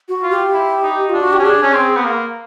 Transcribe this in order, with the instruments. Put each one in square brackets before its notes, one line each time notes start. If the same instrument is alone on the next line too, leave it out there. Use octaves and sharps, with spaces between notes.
[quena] F#4
[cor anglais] F4
[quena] G4
[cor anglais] E4
D#4
[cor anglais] D4 [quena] F4
[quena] F#4
G4
[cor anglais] C#4
[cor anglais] D4 [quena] G#4
[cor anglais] C#4
C4
B3
A#3